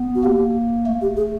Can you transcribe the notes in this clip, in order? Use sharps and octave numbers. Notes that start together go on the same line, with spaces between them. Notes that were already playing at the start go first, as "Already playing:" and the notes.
Already playing: B3
F#4
A#3 G4
A3
G4
G#4